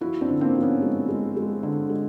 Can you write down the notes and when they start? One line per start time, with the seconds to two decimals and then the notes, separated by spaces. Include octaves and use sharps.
0.01 F3 E4 F#4
0.21 C4 D4
0.29 D3
0.41 A#3 C4
0.55 F3
0.62 B3 C#4
0.82 G#3
1.09 G#3
1.37 G#3
1.63 D3
1.90 G#3